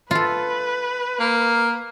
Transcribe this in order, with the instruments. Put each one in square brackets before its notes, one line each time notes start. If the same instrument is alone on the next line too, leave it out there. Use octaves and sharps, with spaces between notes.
[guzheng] F4 A4 [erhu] B4
[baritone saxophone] A#3